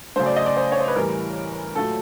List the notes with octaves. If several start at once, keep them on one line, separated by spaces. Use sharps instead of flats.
C#3 F#3 A3 C5
D5
D#5
D5
C5
C#5
C5
B4
A2 E3 G3 A#4
A#2 F#3 A3 A4